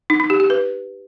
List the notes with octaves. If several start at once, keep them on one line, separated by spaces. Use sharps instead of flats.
D#4
D#4
G4
G4
B4